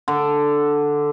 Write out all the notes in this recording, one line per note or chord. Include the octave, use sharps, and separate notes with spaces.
D3